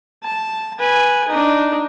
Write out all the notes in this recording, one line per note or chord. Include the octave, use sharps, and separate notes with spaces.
A5
B4 G#5
D4 D#4